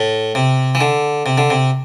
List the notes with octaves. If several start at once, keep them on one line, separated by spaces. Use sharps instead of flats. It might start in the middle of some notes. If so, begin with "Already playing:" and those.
Already playing: A2
C3
E3
D3
C3
D3
C3